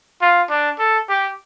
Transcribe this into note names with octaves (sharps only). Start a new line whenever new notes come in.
F4
D4
A4
G4